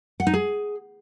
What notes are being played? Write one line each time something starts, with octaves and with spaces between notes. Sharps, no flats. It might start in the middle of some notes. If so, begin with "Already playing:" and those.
F#5
D#4
G#4